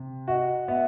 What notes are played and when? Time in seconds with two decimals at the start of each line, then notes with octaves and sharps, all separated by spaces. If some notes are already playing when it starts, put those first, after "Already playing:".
Already playing: C3
0.28 F#4 D#5 E5
0.68 B3 E5